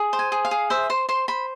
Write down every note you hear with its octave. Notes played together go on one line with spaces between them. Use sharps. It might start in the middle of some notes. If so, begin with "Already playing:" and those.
Already playing: G#4
C5
G#5
G#4
F5
G#4
C5 E5
C5 C6
C5 C6
C5 B5